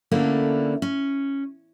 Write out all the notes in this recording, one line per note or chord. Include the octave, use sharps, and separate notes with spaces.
D3 A3 A#3 C#4 D4 E4
C#4